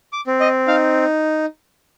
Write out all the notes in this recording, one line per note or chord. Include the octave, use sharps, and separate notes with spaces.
D6
C4
D#5
D#4 F5